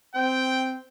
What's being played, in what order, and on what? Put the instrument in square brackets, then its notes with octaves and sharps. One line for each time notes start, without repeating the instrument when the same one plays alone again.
[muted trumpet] C4 [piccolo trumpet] G5